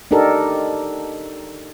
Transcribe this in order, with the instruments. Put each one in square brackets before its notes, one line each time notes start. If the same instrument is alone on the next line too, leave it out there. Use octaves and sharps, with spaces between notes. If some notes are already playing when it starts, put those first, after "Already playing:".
[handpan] D4 D#4 G4 A4 A#4